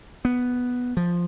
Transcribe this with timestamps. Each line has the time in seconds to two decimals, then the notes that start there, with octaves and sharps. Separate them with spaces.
0.25 B3
0.97 F3